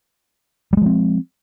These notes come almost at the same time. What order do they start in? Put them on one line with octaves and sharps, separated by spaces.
G3 G#3 F3 C4